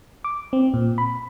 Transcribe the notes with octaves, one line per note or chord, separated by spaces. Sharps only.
D6
C4
A#2
B5